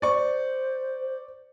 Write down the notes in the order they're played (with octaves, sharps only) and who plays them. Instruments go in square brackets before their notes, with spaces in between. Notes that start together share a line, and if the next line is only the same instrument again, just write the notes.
[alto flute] C5 [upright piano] D5 C#6